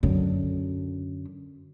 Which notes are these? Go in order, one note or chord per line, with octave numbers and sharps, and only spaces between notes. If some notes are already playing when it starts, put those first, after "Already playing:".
F#2 D3